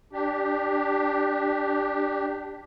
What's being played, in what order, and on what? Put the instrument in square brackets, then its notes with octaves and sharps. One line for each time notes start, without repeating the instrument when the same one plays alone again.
[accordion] D4 G4